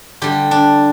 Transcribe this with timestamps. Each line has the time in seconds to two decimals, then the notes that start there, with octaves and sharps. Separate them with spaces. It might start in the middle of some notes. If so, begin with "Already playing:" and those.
0.22 D3 G3 G4
0.51 D4